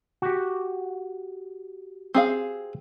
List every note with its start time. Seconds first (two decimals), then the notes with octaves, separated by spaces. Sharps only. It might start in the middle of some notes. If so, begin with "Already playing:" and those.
0.22 F#4 G4
2.14 C4 G#4 F5